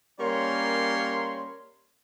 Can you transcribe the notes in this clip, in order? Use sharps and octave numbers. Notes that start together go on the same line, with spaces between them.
G3 A#3 C#4 A#4 C#5 C6